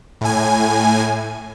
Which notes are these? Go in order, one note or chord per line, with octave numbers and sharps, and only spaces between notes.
A2 G#5